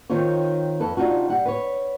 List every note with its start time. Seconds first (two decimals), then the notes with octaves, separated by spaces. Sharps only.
0.10 D#3 C4 D#4 F4 C#5
0.80 F2 A4 B4
0.97 C3 D4 D#4 F4 F#4
1.29 G3 F#5
1.46 B4 C#5